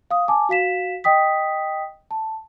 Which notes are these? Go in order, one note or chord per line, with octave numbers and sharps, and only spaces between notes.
F5 D#6
G#5 A5 D6
F#4 F5 B6 E7
D#5 G5 D#6 B6
A5